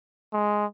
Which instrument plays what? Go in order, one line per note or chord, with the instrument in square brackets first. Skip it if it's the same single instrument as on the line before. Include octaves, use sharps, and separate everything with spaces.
[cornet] G#3